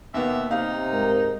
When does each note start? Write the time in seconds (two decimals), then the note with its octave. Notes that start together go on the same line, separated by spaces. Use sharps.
0.14 D#2 B2 B3 E5
0.51 C3 D#4 F5
0.92 G#2 A#4